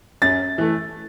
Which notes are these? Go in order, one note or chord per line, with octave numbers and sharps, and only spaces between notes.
F#2 A6
E3 A3